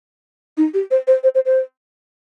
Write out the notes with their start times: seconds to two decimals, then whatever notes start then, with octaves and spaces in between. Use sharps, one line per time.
0.57 D#4
0.74 G4
0.91 C5
1.07 C5
1.23 C5
1.35 C5
1.46 C5